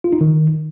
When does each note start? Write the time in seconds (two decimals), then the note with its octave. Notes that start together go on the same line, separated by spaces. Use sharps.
0.04 F4
0.13 D#4
0.21 D#3